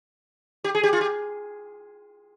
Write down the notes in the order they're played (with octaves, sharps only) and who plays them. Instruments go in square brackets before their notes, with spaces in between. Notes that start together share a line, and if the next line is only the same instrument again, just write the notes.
[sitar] G4
G#4
G4
F4
G4